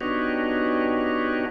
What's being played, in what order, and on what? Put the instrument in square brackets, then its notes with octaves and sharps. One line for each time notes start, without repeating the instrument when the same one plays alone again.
[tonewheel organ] B3 D4 D#4 F#4 G4 C#5